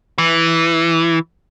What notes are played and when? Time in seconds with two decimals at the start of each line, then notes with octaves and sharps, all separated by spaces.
0.18 E3